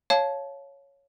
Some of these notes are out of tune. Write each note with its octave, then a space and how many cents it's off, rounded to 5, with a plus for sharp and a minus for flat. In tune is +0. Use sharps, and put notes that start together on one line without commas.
C#5 +0 F5 +0 A5 -20